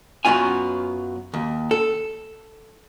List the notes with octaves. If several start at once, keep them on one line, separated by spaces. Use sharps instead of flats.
F#2 F3 F#3 B3 F4 G#5
D#2
A4